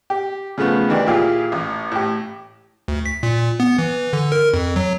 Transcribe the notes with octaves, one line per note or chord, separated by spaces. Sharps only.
G4
C#3 F3 A3 B3
D#3 E3 D4 G4
A#2 E4 F4 G4 G#4
A1
A2 G4
D2
B6
A#2
B3
E3
D3
A#4
F2
F#3